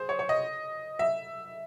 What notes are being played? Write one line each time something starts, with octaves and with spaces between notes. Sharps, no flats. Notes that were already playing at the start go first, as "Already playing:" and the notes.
Already playing: G#4 C5
C#5
C#5
D#5
E5